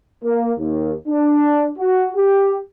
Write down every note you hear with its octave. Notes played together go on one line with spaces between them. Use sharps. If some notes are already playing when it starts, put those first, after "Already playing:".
A#3
D#2
D4
F#4
G4